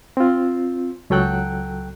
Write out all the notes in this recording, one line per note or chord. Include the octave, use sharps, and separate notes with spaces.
C4 F4
C#2 F#3 A4 G5 F#6